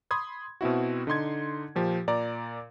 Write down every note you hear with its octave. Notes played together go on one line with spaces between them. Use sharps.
B5 C6 D#6 G#6
B2 C4 E4 F#4
D3 D#4 C6 G#6
A#2 F3 G4
A#2 D5 A#5